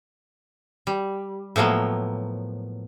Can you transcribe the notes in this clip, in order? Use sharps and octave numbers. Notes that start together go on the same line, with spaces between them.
G3
A2 F3 F#3 A#3 B3